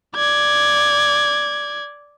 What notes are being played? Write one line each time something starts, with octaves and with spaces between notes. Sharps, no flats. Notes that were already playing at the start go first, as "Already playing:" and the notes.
D5 G#6